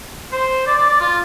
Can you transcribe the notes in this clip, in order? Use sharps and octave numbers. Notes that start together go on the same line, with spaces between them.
C5
D5
D5
D5
F4